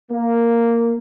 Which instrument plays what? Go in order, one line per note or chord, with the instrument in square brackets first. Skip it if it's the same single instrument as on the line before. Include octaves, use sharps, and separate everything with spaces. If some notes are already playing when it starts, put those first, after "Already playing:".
[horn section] A#3